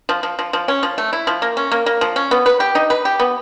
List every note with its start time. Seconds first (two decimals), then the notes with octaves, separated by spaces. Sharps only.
0.09 F3
0.23 F3
0.39 F3
0.53 F3
0.68 C#4
0.83 F3
0.98 A3
1.13 E4
1.27 F3
1.42 A#3
1.57 C#4
1.72 A#3
1.86 A#3
2.01 F3
2.16 C#4
2.31 B3
2.46 B4
2.60 G4
2.75 D#4
2.90 B4
3.05 G4
3.19 B3